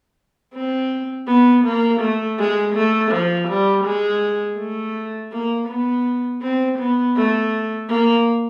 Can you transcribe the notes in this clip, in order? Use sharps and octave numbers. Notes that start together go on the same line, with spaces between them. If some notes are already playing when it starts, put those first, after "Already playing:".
C4
B3
A#3
A3
G#3
A3
F3
G3
G#3
A3
A#3
B3
C4
B3
A3
A#3